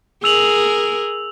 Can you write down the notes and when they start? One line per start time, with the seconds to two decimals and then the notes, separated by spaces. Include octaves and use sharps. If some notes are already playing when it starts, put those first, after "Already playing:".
0.24 G#4 A#4 E6 F7 F#7